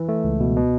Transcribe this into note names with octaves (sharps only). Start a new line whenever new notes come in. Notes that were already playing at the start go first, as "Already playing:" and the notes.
Already playing: E3
A3
C#2
B2
B2